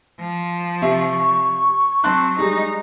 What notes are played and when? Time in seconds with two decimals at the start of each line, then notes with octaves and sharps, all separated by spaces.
0.19 F3
0.82 C3 E5 C#6
2.04 F#3 C4 A5 C6 F#6
2.39 G3 G#3 D#4